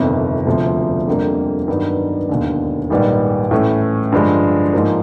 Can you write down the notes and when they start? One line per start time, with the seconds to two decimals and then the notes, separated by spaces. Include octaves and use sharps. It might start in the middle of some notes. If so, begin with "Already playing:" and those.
Already playing: G1 F2 C3 D#3
0.46 E1 D2 C3 F3
1.07 F2 D3 G3 A#3
1.68 G2 D#3 F#3 B3 D#4
2.29 E1 D#2 D3
2.90 A#1 G#2 D#3 G3 B3
3.51 A2 E3 A3 C#4
4.12 G2 D3 F3 G#3
4.73 G#2 F3 A#3